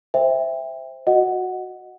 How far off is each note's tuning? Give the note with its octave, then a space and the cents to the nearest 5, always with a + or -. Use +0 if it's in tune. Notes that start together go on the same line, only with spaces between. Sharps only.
C5 +0 E5 +0 G5 +30
F#4 -10 D#5 +0 F#5 +5